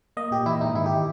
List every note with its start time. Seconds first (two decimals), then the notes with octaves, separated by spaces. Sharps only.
0.17 A#3 D#5
0.31 A#2 G4
0.46 E3 E4
0.61 G#2 D#4
0.75 D#3 E4
0.86 G4